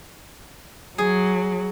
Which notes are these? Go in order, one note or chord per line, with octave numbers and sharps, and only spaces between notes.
F#3 G#4